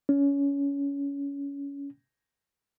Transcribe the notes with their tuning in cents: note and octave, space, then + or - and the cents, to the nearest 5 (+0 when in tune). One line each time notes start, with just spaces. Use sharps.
C#4 +20